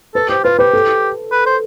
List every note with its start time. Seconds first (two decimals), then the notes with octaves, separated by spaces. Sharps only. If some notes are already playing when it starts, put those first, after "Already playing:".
0.15 A4 B4
0.29 G4 C5
0.44 F4 B4
0.59 G4 B4
0.73 A4
1.32 B4
1.46 C5